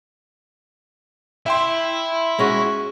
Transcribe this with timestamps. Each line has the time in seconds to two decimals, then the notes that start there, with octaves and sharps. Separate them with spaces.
1.46 E4 E5 G5 C6
2.39 G#3 C#4 F#4